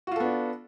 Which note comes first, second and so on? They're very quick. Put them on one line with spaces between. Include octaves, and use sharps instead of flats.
F#4 F4 A4 B3 D4